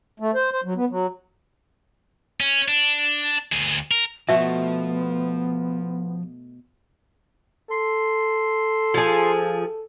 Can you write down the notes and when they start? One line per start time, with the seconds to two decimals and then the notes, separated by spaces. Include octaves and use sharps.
0.20 A3
0.35 C5
0.51 C5
0.64 F#3
0.76 B3
0.90 F#3
2.40 C#4
2.68 D4
3.52 D2 G#4
3.91 A#4
4.29 B2 F3 A3 B3 E5
7.71 A4 C6
8.94 F3 G#4